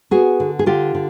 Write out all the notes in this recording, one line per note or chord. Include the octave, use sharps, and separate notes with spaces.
B3 F#4 G#4
D3
G#4
D3 F4 G4
D3